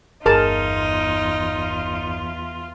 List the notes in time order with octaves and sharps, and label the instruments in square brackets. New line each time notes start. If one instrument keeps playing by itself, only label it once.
[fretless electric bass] G1 [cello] E2 F4 [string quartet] D#4 [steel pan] G#4 A#4 A5